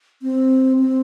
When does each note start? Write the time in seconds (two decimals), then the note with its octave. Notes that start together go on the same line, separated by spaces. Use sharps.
0.22 C4
0.79 C4